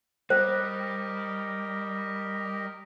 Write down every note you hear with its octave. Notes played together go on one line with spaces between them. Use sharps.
G3 G4 A#4 C5 D#5